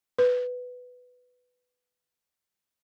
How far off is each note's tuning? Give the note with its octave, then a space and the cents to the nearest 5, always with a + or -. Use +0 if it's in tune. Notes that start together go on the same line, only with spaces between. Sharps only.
B4 +5